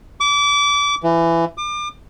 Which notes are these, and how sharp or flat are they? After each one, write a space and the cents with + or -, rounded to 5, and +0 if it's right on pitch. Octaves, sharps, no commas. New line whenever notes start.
D6 -30
E3 +20
D6 +35